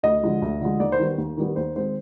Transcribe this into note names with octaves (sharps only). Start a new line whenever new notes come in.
D2 D#5
D3 F3 G#3
D2
D3 F3 G#3
D#2 D5
C5
D#3 G3 B3
D#2
D#3 G3 B3
D#2 C5
D#3 G#3 C4 C5